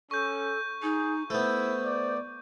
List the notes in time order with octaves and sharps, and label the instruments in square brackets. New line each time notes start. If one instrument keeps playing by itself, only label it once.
[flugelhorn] C#4 [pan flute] A4 [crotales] C#6 G6
[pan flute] D#4 [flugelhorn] G#4
[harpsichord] A3 B3 [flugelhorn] E4 [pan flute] C5
[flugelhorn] D5